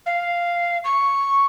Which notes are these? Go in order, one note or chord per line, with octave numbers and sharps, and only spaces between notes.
F5
C#6